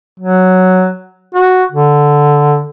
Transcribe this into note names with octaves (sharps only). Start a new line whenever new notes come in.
F#3
F#4
D3